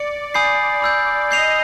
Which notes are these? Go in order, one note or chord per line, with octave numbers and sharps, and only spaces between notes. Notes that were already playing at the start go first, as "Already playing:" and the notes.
Already playing: D5 C#7
G#5 B5 D#6 G6 C7
B5 E6 G6
D#5 G6 C7 F7